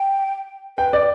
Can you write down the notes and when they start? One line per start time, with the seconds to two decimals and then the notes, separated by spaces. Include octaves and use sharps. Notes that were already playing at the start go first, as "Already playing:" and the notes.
Already playing: G5
0.78 B4 G5
0.93 D5